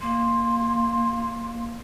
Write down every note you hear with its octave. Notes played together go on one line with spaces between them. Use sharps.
A#3 C6